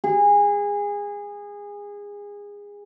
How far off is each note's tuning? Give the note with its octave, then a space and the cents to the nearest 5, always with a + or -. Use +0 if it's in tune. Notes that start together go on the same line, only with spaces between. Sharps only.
G#4 -25